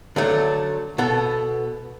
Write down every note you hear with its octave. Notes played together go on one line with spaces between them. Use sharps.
D3 F#3 A3
B2 B3 A4